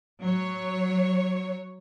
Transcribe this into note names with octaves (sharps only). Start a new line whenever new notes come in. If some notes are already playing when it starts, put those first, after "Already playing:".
F#3 C#5